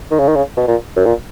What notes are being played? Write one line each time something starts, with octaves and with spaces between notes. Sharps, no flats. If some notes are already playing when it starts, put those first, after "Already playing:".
D#3
C#3
D#3
C#3
B2
A#2
F#2
A#2